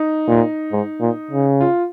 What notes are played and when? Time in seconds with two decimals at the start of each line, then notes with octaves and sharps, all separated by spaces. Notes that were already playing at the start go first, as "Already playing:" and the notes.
Already playing: D#4
0.28 A#2
0.72 G#2
1.01 A#2
1.31 C#3
1.61 F4